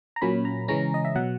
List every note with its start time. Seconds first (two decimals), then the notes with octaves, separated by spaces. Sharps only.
0.16 A#5
0.21 A#2 F#3 A#3 C#4 B5
0.45 A#5
0.68 C#3 E3 G#3 C#4 A#5
0.94 D#5
1.05 E5
1.15 B2 F#3 F#5